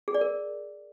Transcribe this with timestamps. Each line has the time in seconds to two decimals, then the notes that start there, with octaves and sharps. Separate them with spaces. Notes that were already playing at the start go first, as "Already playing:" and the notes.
0.08 G#4
0.14 D5
0.21 A#4